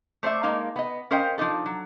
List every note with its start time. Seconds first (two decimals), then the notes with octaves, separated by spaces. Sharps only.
0.23 A3 C5 D5 E5
0.43 G#3 A#3 D#4 F5
0.76 B3 D#5
1.11 C#4 A#4 C5 D#5 F5 G5
1.38 F3 D4 D#4 A4
1.66 F#3